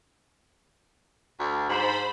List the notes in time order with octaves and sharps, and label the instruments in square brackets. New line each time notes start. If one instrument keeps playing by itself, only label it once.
[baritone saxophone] D2
[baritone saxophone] G#2 [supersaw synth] C5 B5